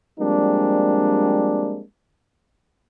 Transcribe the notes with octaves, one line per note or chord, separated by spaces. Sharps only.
F3 G3 G#3 A#3 C4 D4